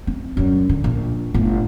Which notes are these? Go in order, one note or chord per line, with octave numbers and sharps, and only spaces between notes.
C4
F#2 G3
D3
A#1
G1 A2